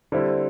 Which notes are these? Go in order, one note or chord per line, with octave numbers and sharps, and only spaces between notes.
D3 G3 C4 E4